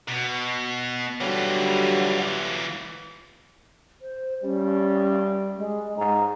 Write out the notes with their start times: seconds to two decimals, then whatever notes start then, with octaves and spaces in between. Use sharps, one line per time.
0.08 B2
1.21 D3 E3 F#3 G3 F4
4.01 C5
4.43 G3 C#4
5.58 G#3
5.97 G#2 A#5